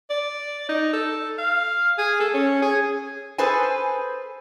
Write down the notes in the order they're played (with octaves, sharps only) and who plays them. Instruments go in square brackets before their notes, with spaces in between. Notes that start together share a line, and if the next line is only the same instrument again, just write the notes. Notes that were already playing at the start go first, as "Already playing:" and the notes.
[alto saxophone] D5
D#4
A4
F5
G#4
A4
C#4
G#4
[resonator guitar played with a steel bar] G#4 A4 B4 C5 G#5